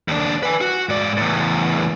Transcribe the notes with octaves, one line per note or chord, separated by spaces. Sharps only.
D#2 D4
B4 G#5
F#4
G#2 D5
E2 A2